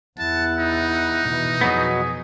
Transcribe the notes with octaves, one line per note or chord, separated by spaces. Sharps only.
E2 E4 F#5 A5
D#4
B2 E3
F2 B2 F#3 B3 G#4